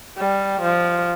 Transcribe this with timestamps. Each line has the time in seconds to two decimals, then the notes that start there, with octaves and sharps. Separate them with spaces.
0.18 G3
0.62 F3